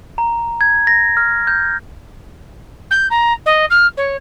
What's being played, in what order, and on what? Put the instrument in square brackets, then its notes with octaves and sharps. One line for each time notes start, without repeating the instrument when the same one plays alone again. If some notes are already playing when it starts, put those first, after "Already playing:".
[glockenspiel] A#5
G#6
A#6
F6
G6
[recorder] G6
A#5
D#5
F6
C#5